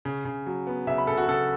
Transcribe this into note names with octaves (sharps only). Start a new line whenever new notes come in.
C#3
C#3
F#3
B3
C#3 E5
B5
C#3 A4
F#4
C#3 A4